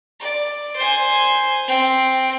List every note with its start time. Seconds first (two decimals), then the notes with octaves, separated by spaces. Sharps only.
0.20 D5
0.76 C5 G#5
1.67 C4